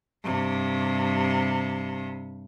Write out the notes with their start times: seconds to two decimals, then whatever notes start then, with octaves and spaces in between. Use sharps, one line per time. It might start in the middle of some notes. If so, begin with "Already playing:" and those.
0.24 G2 C3